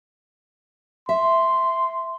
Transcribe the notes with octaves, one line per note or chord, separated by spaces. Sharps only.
E5 C6